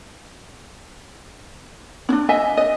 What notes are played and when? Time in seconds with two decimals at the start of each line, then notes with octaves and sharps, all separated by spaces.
2.09 C#4 D4
2.29 D#5 E5 G#5
2.57 D#5